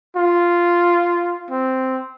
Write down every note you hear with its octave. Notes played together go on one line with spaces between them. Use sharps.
F4
C4